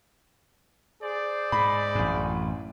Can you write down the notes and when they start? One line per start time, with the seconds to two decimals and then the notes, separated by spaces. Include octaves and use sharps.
1.02 G#4 C5 D5
1.52 G#2 B5
1.95 A1 F#2